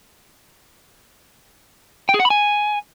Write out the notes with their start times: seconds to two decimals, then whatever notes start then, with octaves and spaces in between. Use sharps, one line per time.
2.09 G5
2.14 G#4
2.20 F#5
2.25 B5
2.30 G#5